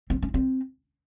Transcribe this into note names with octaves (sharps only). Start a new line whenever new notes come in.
C4
C#4
C4